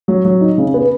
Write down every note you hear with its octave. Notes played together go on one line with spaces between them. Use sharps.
F#3
F#3
D#4
C#3
B3